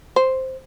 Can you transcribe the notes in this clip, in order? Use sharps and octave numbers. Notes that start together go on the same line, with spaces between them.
C5